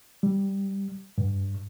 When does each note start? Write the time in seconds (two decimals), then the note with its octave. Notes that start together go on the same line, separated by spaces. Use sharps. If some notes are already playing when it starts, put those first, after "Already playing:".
0.23 G3
1.18 G2